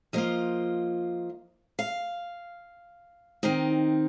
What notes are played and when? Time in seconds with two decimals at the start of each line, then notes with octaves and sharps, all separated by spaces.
0.13 F3 A#3 F4 D#5
1.79 F5
3.43 D#3 C4 D#4